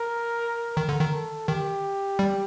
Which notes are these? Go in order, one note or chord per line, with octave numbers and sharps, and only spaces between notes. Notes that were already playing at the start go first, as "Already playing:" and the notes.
Already playing: A#4
D#3 A#4
D3
D#3
A4
D#3 G4
G3